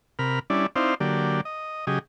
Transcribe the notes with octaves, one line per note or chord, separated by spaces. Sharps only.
C3 A#4 B5 F6
G3 C#4 D4 E4 D5
C4 D#4 E4 C5 D5 F5
D3 F#3 A#3 G4 D5
D#5
C#3 F#3 G4 G#4 D#5